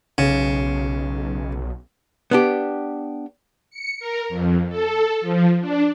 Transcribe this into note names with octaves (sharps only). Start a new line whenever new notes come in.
B1 C#3
B3 D4 G4
C#7
A#4
F2
A4
F3
D4